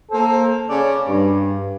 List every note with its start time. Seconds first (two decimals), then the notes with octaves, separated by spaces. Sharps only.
0.11 A#3 A4 C5
0.69 C#3 D5
1.08 G2